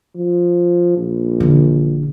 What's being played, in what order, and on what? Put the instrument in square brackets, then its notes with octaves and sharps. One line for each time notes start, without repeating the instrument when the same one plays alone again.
[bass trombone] F3
A#1
[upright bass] E1 D3